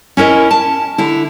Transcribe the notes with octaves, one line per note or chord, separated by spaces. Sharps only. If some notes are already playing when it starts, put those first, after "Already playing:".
C#4 E4 A#4 D#5
A5
D3 E4